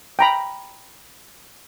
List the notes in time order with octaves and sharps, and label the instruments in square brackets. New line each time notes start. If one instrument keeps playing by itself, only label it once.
[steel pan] G5 A#5 B5